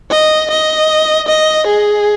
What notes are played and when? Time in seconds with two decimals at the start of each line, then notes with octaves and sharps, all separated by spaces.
0.11 D#5
0.51 D#5
1.28 D#5
1.67 G#4